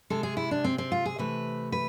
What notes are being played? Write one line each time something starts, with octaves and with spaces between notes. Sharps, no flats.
C3 G#3 A4
G#4
E4
D4
C4
C4
F4
G#4
C3 E3 A3 B4
B4